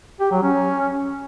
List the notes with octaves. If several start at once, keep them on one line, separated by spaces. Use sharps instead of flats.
G4
F#3
C#4